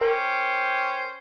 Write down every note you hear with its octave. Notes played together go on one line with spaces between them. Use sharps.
C#4 G4 A#4 C5